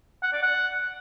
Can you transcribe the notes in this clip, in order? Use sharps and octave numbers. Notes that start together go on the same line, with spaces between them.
F#5
D5
F#5